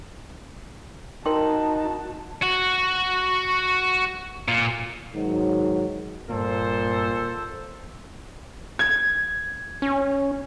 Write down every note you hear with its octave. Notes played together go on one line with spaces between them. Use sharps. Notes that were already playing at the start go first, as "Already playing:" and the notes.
D#4 F#4 A#4 G5 A5 C6
F#4
A#2
G#2 D#3 F#3
G2 A#2 A#3 A4 C5
G#6
C#4